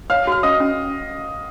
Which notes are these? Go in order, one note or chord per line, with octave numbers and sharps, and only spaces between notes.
C#5 F5 F6
F#4 F6
C#4 D#5 D#6
C#4